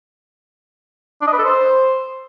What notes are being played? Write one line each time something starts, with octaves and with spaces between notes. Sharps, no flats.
D4
D#5
B4
A4
C5